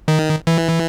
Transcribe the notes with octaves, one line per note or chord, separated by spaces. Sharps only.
D#3
E3